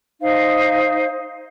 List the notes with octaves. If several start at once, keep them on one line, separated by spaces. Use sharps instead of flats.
D#4 C5 F5